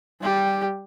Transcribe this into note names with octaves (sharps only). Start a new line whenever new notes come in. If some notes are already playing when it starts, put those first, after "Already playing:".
G3 G4